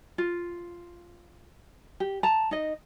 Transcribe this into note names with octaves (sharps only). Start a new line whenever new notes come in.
F4
G4
A5 A#5
D#4 D#5